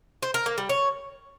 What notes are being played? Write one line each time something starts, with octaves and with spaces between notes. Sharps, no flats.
C5
A#4
A#3
G3
C#5